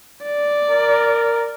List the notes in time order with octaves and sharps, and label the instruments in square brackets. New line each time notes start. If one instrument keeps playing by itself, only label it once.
[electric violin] D5
[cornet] A#4